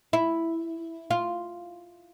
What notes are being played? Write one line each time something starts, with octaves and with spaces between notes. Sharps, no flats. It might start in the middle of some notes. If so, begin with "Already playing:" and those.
E4
F4